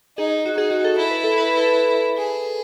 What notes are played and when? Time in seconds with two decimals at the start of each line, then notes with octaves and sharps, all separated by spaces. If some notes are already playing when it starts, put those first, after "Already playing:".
0.18 D#4 G#4
0.46 F#4
0.57 D#4 G#4
0.71 F#4
0.84 A4
0.97 E4 A4
1.11 B4
1.24 A4
1.38 B4
1.57 A4
2.17 G#4